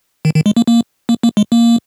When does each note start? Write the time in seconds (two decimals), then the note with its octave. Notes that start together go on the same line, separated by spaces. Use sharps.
0.25 D#3
0.35 D#3
0.46 G#3
0.57 A#3
0.67 A#3
1.09 A#3
1.23 A#3
1.37 G#3
1.52 A#3